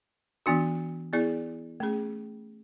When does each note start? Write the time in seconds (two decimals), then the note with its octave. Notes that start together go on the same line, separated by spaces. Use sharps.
0.46 E3 B3 D4 F#4
1.13 B3 E4 G#4 D5
1.80 A3 C#4 G#4